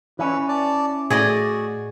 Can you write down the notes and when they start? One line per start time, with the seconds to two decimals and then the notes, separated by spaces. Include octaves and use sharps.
0.19 E3 C#4 B4
0.48 D5 A5
1.10 A2 F#4 G#4 D5 D#5